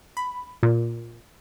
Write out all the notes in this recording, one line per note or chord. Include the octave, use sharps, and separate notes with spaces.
B5
A#2